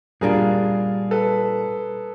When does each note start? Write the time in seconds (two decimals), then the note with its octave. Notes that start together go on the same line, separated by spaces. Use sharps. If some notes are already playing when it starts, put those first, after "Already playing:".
0.21 A#2 G3 A#3 D4 F4 G#4 A#4
1.11 A4 B4